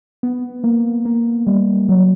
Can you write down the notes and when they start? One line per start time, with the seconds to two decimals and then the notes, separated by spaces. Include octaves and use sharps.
0.23 B3
0.64 A#3
1.05 A#3
1.47 G3
1.89 F#3